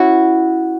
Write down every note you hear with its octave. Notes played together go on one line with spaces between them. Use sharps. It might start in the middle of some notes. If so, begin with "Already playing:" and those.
Already playing: C#4 E4 F#4